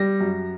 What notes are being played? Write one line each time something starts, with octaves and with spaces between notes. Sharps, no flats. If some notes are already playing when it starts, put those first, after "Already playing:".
Already playing: G3 A#6
F#2